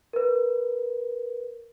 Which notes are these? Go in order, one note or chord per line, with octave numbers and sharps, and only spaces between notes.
A#4 B4